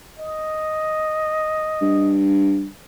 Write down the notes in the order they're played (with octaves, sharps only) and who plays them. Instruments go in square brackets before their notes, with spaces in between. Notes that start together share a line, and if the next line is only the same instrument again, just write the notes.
[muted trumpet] D#5
[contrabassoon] G2